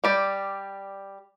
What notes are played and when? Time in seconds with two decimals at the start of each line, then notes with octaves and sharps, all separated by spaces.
0.04 G3 G4 D5